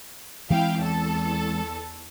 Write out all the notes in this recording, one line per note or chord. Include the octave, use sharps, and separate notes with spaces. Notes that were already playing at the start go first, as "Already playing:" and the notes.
E3 G#3 C4 E4 F5 G5
E2 A4